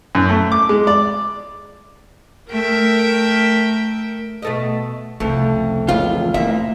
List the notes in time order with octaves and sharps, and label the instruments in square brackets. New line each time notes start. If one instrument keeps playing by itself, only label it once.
[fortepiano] F#2
A3
D6
G#3
D5
[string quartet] A3 A#4 E5 G5
[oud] B2 A3 D#5
[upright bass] C2 C#3 [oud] F2 [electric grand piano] A3
[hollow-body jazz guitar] C#2 F4 [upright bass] A#2 E3
[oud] D2 A#3 [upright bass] E3 [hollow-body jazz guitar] E5